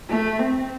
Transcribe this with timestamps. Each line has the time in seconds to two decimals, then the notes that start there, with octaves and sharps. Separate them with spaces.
0.09 A3
0.39 C4